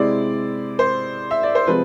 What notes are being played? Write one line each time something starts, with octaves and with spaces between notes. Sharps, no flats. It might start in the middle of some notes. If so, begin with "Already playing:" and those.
Already playing: C3 G#3 C4 E4 D5
C5
E5
D5
C5
C3 F3 G#3 C4 B4